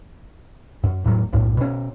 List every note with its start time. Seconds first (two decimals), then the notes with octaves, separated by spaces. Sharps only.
0.83 F#2
1.04 E1 A2 F#3
1.33 B1 F#2 A2
1.57 B2 C#4